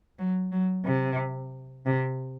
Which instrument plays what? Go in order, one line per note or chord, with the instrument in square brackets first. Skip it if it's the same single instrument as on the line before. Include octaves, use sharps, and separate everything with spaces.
[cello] F#3
F#3
C3
C3